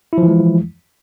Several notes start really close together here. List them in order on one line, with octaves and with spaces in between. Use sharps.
E4 F3 E3 G#3